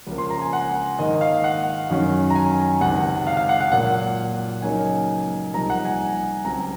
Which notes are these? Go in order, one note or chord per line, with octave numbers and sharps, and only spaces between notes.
C#2 C#3 F3 A#3
C6
A#5
G#5
F#5
G#2 D#3 A#3 D#4 D#5
F5
F#5
F#2 D#3 F#3 C#4
A#5
G#5
C#2 C3 D#3 F#5
F5
F5
F#5
F#5
A#2 F#3 A#3 F#5
C#2 C#3 F#3 A#3 D#4 G#5
C2 C3 F3 A#3 D#4 A#5
F#5
G#5
C#2 C#3 F#3 C4 A#5